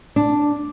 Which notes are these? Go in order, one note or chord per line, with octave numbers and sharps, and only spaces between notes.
D4